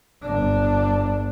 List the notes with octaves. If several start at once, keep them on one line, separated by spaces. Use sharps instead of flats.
G1 D4